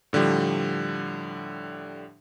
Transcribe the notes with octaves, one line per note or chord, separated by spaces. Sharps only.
A2 D3 F3 G3